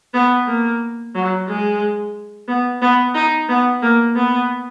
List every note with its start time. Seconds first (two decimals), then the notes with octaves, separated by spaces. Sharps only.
0.14 B3
0.47 A#3
1.15 F#3
1.48 G#3
2.48 B3
2.82 B3
3.15 D#4
3.49 B3
3.82 A#3
4.16 B3